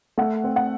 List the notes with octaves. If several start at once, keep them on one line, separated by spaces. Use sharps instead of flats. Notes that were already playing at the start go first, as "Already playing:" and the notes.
A3 F#5
C4
F#5